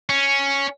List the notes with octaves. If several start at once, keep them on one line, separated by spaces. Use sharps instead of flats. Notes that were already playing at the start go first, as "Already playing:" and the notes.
C#4